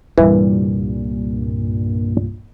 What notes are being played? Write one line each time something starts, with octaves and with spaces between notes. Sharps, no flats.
C2 G2 A#2 E3 G3